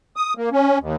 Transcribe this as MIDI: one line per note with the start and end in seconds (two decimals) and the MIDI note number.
0.16 0.34 87
0.37 0.49 58
0.52 0.78 61
0.80 0.96 39